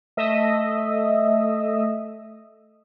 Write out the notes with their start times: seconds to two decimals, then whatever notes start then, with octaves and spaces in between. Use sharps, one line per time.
0.17 A3 D#5 E5